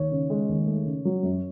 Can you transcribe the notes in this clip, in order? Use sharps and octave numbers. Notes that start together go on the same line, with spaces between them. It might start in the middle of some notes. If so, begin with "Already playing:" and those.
Already playing: D#2 C#5
C#3
G#3
D#2
A3
C#3
F#3
F#2